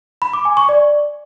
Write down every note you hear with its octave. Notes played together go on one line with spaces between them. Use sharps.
B5
D6
G#5
C#6
D5